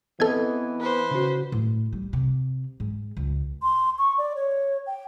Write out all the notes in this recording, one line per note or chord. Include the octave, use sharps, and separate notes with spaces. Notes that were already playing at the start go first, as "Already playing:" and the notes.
E3 B3 C4 A4 D#5 G#6
B4 C5
C#3 F#4
A2
G3
C3
G#2
C#2
C6
C#6
D5
C#5
G5